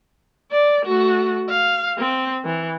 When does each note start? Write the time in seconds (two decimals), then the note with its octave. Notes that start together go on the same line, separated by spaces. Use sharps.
0.51 D5
0.85 A3 F#4
1.49 F5
1.99 C4
2.45 E3